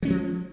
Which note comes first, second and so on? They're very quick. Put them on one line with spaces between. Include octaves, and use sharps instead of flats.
F#3 C#4 G#3 F3